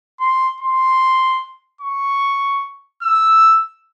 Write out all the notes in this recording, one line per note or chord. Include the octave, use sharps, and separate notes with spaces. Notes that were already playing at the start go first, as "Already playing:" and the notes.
C6
C6
C#6
E6